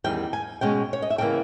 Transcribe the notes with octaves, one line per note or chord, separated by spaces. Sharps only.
E2 D#3 G3 C#4 G5
G#5
B2 G#3 C#4 G5
C#5
D#5
E5
C#3 E3 A#3 C#4 G5